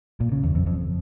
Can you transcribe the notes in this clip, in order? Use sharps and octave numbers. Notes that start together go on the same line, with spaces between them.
A#2
C#3
E2
F2
F2